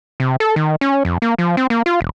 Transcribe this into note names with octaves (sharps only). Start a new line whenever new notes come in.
C3
A4
D#3
C#4
F2
A#3
F3
C4
A#3
F4
E1